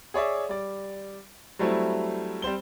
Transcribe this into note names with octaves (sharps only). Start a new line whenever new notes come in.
G#4 C#5 D5 E5
G3 D5
F#3 G3 A3 C4 E4
G3 C4 C5 G7